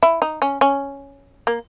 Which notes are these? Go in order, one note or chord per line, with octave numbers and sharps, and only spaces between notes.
E4
D#4
C#4
C#4
A#3